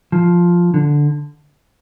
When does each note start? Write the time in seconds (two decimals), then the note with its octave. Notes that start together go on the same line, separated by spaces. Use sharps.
0.12 F3
0.74 D3